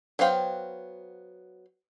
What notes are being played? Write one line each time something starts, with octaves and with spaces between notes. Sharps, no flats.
F#3 B3 C5 F5 G5